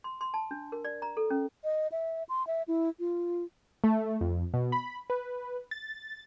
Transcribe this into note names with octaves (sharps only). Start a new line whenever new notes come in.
C6
C6
A5
D4
A#4
D5
A#5
A4
C#4
D#5
E5
C6
E5
E4
F4
A3
F2
B2
B5
B4
A6